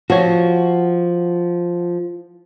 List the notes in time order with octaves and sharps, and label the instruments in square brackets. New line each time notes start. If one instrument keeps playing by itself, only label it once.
[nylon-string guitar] F3 [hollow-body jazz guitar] F#4 C#5